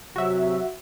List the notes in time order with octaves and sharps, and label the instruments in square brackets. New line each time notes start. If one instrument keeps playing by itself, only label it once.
[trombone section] C3 F#3 [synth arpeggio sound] F#4 E5